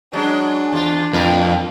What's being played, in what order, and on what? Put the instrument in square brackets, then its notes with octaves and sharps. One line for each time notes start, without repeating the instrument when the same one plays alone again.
[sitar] F#3 G#3 [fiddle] D4
[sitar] E2 F4
[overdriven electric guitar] F2 [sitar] A2 A#4 B4